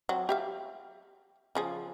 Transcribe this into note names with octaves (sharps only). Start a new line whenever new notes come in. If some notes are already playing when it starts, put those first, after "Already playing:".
F#3 C4
G4 E5 F5
C#3 F3 G#4